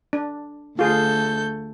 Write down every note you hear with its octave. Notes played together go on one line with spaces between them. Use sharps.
D4
D2 F4 G#4 A4 G6